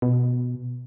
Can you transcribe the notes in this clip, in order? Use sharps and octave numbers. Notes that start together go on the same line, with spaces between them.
B2